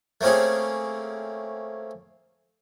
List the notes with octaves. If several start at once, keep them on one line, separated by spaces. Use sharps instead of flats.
A3 A#3 C4 C#4 G#4